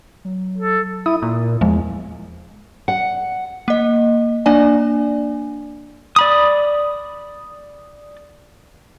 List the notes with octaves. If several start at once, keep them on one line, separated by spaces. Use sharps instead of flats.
F#3
A4
E4 D#6
A#2
E2 F3 G#3
F#5
A#3 D#5
A#3 D4 D5 G#5
D5 B5 D#6